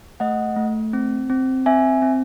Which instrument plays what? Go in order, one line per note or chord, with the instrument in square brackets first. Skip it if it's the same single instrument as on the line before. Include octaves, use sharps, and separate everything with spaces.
[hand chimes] A3 D#5 F#5
A3
C4
C4
C4 E5 G#5
C4